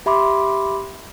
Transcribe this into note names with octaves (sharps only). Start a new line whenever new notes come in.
G4 E5 B5 C6 D6